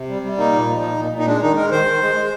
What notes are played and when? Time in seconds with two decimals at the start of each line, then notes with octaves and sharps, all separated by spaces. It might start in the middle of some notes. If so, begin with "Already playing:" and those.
Already playing: C3
0.09 G3
0.22 G3
0.37 A#3 D#4
0.52 A#2
0.68 F3
0.83 A#2
0.98 A#2
1.12 A#2
1.19 D#4
1.27 G#3 D4
1.42 D#3 D#4
1.56 G#3 A#4
1.71 D#3 C5
1.86 D#3
2.01 G#3
2.15 G#3